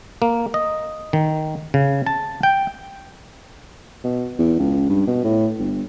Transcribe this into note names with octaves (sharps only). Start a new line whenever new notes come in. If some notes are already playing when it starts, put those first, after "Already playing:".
A#3
D#5
D#3
C#3
A5
G5
B2
E2
C#2
G2
B2
A2
G1